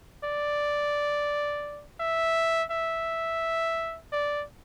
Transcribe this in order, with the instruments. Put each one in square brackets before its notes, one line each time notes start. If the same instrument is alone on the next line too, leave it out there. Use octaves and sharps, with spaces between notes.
[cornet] D5
E5
E5
D5